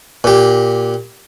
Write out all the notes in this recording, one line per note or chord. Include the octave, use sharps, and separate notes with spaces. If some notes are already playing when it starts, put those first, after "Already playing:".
A#2 G4